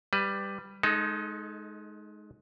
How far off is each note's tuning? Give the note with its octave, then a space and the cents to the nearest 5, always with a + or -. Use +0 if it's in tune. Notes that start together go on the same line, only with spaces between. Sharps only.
G3 +5 B4 +20
G#3 +25 D#4 +0 A4 +0